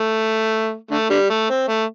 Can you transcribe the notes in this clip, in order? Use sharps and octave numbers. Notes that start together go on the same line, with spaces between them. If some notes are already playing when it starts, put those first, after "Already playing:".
Already playing: A3
D3 A3
D3 G3
A3
C4
A3